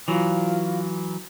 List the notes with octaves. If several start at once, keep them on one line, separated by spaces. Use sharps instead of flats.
E3 F#3 F4